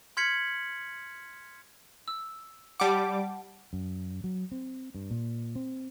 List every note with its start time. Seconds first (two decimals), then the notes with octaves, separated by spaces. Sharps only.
0.17 C6 F6 G#6 B6 C#7 F#7
2.08 E6
2.80 G3 F#5 A5 D6
3.73 F#2
4.24 F#3
4.52 C4
4.95 G2
5.11 A#2
5.55 C4